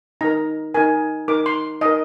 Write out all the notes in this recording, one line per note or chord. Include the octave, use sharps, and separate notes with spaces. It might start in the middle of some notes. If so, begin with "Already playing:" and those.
D#4 A#4 A#5
D#4 A#4 G#5
D#4 A#4 D6
C6
D#4 A#4 D#5